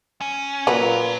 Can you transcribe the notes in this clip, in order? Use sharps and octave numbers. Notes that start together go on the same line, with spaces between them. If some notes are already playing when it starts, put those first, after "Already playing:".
C#4
A#2 F#3 C#4 B4 C#5 A#5